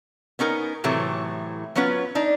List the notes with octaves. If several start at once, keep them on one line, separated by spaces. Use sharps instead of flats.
B3 C#4 D#4 A#4
A2 C3 E3 F#3 A3
F#3 B3 C#4 F4 B4
D4 D#4